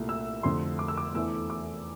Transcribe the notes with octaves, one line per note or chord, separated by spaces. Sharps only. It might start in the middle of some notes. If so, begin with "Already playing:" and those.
Already playing: C2 A#2 A3
E6
F2 D3 A3 C6
D6
E6
D6
E2 E3 A3 E6
D6